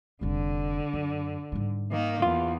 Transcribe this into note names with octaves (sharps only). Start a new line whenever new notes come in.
F1 D3 G3
F#2
G#2 G3
D#3 A#3
E2 F4